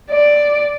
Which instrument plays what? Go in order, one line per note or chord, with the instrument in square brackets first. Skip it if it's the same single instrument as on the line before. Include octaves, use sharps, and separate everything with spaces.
[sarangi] D5